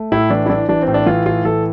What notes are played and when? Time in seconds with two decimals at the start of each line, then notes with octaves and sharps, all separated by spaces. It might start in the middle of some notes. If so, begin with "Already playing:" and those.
Already playing: A3
0.12 A2 E4
0.30 E3 D4
0.46 E4
0.50 E3 D4
0.69 E3 D4
0.82 C4
0.88 A2
0.94 D4
1.06 E3 F4
1.26 A2 F4
1.45 E3 A4